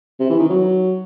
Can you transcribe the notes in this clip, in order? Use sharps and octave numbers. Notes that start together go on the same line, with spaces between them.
C3
E3
D#3
F#3